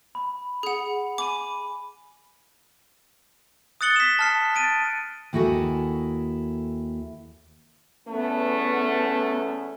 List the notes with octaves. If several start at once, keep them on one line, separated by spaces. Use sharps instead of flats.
B5
G#4 F#5
G#5 B5 D6 D#7
D#6 F#6 A6 C#7 F#7 G7
B6 E7
A5 F6 C7
A6 D7 D#7
D#2 E4 F#4 G#4 A4
E2 A3 B3 C#4